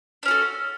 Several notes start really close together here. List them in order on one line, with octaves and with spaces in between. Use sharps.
D4 C#4 F#4 A4